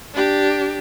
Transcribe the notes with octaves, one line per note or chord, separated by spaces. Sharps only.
D4 G4